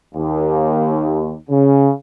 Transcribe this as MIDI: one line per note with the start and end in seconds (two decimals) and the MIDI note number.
0.15 1.35 39
1.50 1.91 49